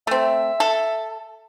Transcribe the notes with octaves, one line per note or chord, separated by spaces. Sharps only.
A3 C4 E5
A4